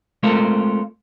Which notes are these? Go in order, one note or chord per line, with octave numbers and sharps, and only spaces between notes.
G#3 A3 C4 F4 A4 A#4